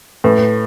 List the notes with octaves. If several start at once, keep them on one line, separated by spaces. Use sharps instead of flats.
A2 B4